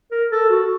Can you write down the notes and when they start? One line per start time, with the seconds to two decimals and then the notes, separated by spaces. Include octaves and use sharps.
0.11 A#4
0.32 A4
0.50 F#4